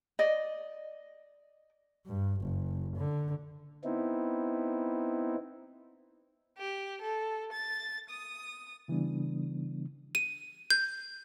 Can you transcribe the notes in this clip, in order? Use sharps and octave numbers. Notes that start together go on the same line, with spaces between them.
D5 D#5
G2
F#1
D3
B3 C4 D#4 E4
G4
A4
A6
D#6
C#3 E3 G3 B3 D4
D#7
G6